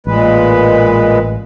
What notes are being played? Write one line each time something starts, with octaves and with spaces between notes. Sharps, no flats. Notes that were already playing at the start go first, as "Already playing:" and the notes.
A1 A#2 G#3 B4